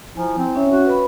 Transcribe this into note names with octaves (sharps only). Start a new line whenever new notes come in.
F3 E4 G#5 A#5
C4
C#4 C#5 E5
F#4
B4 B5